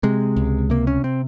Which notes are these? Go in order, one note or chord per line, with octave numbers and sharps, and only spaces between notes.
C3 G#3
C#2
C3 A#3
C#4
C4